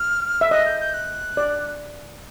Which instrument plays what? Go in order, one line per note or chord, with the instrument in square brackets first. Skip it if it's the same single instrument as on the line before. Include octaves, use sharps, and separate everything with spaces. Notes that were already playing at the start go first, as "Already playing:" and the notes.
Already playing: [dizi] F6
[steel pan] E5
[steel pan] D#5 [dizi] F#6
[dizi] G6
G6
F#6
[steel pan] D5